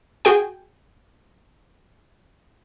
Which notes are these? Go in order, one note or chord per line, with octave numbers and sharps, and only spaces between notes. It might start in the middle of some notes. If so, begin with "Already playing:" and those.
F#4 G#4 G5 G#5